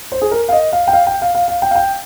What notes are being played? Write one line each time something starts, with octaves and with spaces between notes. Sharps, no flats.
C5
G#4
A#4
F5
D#5
F5
G5
F5
G5
F5
F5
F5
G5
F5
G5